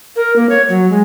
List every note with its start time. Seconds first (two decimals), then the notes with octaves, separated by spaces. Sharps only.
0.16 A#4
0.36 A#3
0.49 C#5
0.69 F#3
0.90 G#3